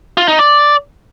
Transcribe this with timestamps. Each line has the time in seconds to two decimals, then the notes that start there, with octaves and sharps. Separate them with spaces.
0.17 F4
0.28 D#4
0.39 D5